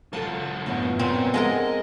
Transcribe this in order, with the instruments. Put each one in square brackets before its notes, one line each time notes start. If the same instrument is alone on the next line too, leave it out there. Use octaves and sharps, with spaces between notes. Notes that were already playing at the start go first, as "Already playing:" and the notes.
[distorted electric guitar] F#3 F4 [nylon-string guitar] A4 A5
[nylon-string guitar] F#2 A2 D3 [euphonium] B3
[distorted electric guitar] A#2 G#5 [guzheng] C4
[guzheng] G#3 F4 A#4 [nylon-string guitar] A4 F#5 [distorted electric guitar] D#5